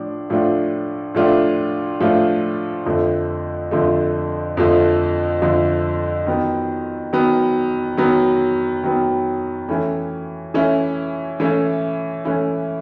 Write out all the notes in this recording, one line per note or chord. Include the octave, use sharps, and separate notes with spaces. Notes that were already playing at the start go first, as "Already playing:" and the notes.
Already playing: A2 F3 D4
A2 F3 A3 D4 F4
A2 F3 A3 D4 F4
A2 F3 A3 D4 F4
F2 D3 F3 A3
F2 D3 F3 A3
F2 D3 F3 A3
F2 D3 F3 A3
D#3 F#3 B3
D#3 F#3 B3
D#3 F#3 B3
D#3 F#3 B3
E3 A3 C#4 E4
E3 A3 C#4 E4
E3 A3 C#4 E4
E3 A3 C#4 E4